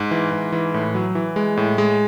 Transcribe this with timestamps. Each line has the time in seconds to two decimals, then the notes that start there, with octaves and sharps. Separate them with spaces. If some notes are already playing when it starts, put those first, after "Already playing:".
Already playing: G#2
0.11 E3
0.32 G#2
0.52 E3
0.74 A2
0.95 F#3
1.15 E3
1.36 G#3
1.57 A2
1.78 G#3